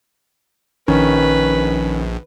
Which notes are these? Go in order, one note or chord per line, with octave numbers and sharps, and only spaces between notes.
A#1 D#3 C#4 B4